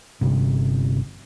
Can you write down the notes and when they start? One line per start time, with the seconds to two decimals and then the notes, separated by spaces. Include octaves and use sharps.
0.21 G1 C3